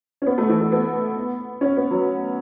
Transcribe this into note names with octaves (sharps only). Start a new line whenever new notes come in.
C#4
B3
A3
E3
A3
B3
C#4
B3
F#3